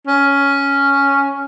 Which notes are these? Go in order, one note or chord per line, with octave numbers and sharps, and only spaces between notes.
C#4